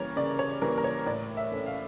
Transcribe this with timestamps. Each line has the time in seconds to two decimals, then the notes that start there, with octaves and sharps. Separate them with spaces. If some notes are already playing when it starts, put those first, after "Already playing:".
Already playing: C#3 E3 G3 A#3 A#4 C#5
0.16 C#3 D5
0.39 C#5
0.61 E3 G3 A#3 A#4
0.78 A#4
0.84 C#5
1.06 A2 D5
1.37 E5
1.51 E3 A3 C#4
1.66 F5